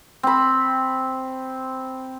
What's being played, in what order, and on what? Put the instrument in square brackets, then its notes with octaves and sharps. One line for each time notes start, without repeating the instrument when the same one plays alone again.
[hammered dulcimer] C4 B5